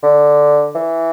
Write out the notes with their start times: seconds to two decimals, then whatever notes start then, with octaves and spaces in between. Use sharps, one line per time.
0.03 D3
0.75 E3